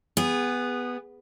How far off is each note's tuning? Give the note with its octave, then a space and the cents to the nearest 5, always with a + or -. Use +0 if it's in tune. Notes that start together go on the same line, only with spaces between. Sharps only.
B3 +0 G#4 -25